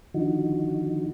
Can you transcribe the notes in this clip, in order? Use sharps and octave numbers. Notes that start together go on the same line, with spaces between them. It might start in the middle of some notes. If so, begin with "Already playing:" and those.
D3 D#3 F3 D#4 F#4